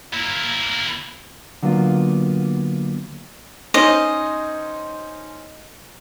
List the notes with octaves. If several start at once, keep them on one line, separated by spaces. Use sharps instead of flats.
A#3 E4
D3 F#3 A#3 B3 F4
C#4 D#4 C5 D#5